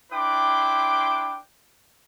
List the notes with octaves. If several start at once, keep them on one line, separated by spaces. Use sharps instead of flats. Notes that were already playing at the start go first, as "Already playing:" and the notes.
D4 E4 B4 G5 C6 D6